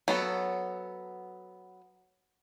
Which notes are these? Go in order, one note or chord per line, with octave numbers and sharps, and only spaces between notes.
F#3 B3 A4